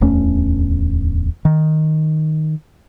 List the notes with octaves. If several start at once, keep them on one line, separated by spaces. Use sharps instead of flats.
D1 E2 A3 C#4
D#3